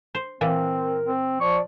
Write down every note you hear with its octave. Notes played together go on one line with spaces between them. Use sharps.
C5
A#2 E3 A#3 C4 A#4
C4
F3 D5 C#6